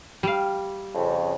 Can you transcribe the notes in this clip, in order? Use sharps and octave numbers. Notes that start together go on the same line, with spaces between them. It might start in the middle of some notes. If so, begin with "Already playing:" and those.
G3 F5
F2 C#3